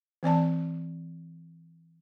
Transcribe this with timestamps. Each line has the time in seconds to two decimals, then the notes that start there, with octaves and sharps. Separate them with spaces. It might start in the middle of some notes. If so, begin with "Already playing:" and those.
0.23 E3 C4 D5 A5